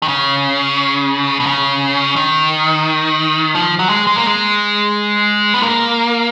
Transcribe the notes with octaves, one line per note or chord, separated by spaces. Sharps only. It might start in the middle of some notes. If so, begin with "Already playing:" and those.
D#3
C#3
B2
C#3
D#3
F3
F#3
G#3
G#3
A#3
G#3
B3
A#3